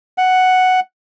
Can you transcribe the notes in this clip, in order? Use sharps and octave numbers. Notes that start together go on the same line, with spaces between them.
F#5